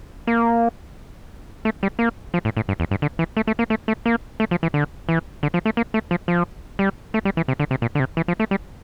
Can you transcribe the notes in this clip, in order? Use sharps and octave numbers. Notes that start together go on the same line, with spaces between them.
A#3
A3
G3
A#3
F3
A2
A2
G2
E2
G2
D3
E3
A3
A3
A#3
A3
A3
A#3
A3
F3
E3
D3
E3
D3
F3
A3
A#3
A3
F3
F3
G3
A3
G3
E3
C3
D3
C3
A#2
D3
C3
E3
F3
A3
G3